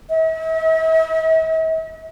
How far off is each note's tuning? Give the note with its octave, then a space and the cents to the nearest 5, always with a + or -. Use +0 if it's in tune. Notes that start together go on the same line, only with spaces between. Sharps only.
E5 -45